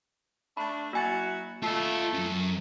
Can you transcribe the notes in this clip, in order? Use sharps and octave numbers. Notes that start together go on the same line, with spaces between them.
A3 D4 B5
F#3 A#3 E4 F#4 G#5 A6
A3 F4 D#5
F#2 C#4